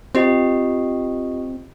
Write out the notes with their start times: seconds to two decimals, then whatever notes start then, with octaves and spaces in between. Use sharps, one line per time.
0.15 C4 F4 G4 D#5